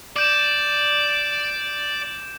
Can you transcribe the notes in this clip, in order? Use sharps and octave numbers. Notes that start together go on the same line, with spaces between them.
D5 D6 G6 E7